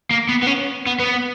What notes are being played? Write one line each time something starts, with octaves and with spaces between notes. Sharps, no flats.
A#3
B3
B3
C#4
B3
B3